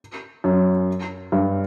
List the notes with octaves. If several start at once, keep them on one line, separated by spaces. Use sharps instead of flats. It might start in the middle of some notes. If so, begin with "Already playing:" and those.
F#2
G2